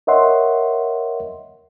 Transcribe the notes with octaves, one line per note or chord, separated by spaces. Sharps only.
A#4 C#5 D#5 E5 F#5 C6